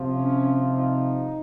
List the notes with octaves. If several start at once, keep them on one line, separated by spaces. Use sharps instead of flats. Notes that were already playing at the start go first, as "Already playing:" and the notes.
Already playing: C3 F3
C#4
D#4